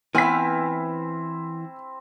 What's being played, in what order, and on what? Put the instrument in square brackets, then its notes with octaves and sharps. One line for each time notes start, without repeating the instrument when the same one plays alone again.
[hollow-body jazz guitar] E3 B3 [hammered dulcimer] C4 E4 [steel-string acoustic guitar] G#5 [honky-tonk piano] F6 B6